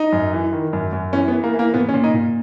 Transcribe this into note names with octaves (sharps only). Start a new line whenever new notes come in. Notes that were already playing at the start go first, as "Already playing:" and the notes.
Already playing: D#4
F#2
E3
D#3
F#2
F#2
E3 C#4
B3
E3
A#3
E3
A#3
A#2 B3
C#4
A#2
D#4
A#2